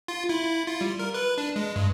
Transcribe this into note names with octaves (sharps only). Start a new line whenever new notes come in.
F4
E4
F4
G3
A#4
B4
D4
G#3
G2